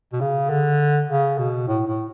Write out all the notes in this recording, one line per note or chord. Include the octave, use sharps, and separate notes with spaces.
B2
C#3
D3
C#3
B2
A2
A2